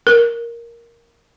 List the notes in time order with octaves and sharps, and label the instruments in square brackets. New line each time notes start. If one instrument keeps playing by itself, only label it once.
[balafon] A#4